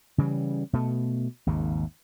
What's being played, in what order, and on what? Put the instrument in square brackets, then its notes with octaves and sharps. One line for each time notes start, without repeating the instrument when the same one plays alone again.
[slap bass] C#3 E3 G3
B2 A3
G#1 D#2 C#3